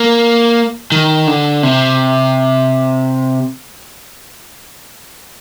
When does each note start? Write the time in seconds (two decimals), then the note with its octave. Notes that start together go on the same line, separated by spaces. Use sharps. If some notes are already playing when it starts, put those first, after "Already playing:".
Already playing: A#3
0.92 D#3
1.27 D3
1.63 C3